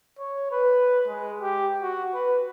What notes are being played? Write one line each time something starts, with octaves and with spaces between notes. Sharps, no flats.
C#5
B4
G#3
G4
F#4
B4